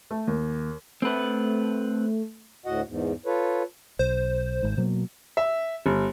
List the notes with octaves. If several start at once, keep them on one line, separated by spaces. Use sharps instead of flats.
A3
D#2
A3 C4 B4
D2 A2 F#4 D#5 F#5
E2 G#2
F4 A4 B4 C#5
B1 C5
G#1 G#2
B2 F#3 A#3
E5
G1